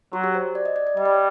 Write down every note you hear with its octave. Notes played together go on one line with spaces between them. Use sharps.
F#3 F#4
G4
C5
D5
D#5
D5
D5
G3 D#5
D5
C#5